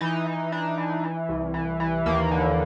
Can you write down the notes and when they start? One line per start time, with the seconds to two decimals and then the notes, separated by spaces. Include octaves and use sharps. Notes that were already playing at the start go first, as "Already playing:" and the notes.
0.01 E3 D#4
0.26 E3
0.52 E3 D4
0.78 E3
1.03 E3
1.29 C2
1.54 E3
1.80 E3
2.06 D#2 A#3
2.31 D3